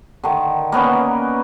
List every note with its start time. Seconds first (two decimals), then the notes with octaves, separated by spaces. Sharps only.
0.24 D3 D#3
0.72 A#3 B3 C#4 B4